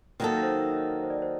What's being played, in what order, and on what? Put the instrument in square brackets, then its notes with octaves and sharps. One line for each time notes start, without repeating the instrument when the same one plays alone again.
[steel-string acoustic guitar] D#3 F#3 A#3 D#4 A4 [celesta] A#4
[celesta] C5
C5
D5
C5